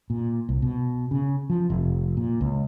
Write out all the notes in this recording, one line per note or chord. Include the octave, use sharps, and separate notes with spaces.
A#2
C2
B2
C#3
F3
F1
A#2
C#2